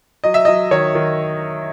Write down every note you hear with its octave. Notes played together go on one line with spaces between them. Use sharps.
F#3 D#5
E5
F#3 D#5
D#3 C#5
D#3